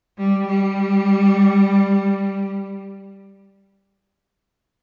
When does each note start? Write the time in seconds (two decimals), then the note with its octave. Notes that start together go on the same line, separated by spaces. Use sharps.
0.18 G3
0.47 G3